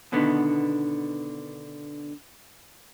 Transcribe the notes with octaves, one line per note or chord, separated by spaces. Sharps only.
B2 D3 D#3 B3